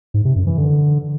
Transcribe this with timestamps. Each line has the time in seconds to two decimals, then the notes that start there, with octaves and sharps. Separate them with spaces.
0.14 G#2
0.25 C3
0.36 F#2
0.47 E3
0.58 D3